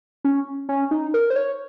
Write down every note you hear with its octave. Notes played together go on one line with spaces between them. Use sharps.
C#4
C#4
D#4
A#4
C5
C#5